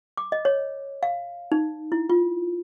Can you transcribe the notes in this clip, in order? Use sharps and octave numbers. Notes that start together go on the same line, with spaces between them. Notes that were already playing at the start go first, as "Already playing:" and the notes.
D6
D#5
C#5
F5
D#4
E4
F4